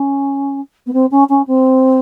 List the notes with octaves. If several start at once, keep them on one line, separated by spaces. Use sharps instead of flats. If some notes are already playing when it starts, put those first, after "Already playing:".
Already playing: C#4
B3
C4
C#4
C#4
C4